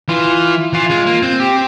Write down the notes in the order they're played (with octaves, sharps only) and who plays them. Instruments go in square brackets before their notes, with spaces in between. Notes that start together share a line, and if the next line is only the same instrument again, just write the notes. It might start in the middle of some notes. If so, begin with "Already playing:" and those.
[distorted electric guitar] E3 [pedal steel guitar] F4
[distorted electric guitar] E3 [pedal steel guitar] F4
[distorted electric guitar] G#3
A#3
C4
[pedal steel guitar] G4